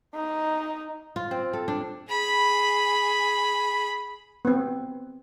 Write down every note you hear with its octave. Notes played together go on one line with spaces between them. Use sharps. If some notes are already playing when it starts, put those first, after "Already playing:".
D#4
F4
C4
A4
D4
G#4 B5
B3 C4